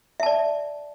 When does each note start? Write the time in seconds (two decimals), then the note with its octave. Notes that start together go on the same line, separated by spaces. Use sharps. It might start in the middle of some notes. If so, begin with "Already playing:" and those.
0.20 E5
0.23 A5
0.26 D5